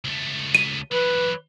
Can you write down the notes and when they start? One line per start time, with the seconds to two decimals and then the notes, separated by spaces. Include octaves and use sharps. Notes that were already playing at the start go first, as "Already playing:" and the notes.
0.04 C#2 A3
0.55 D#7
0.92 E3 F#3 B4